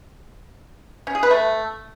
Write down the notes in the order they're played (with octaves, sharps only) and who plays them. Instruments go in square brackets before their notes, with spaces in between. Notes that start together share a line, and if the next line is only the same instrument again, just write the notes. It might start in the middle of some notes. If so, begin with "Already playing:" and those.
[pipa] C#4
G#4
B4
A3